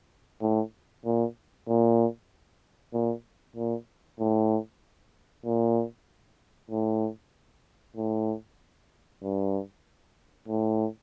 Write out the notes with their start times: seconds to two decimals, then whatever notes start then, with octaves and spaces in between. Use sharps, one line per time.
0.42 A2
1.05 A#2
1.68 A#2
2.94 A#2
3.56 A#2
4.20 A2
5.45 A#2
6.71 A2
7.96 A2
9.23 G2
10.48 A2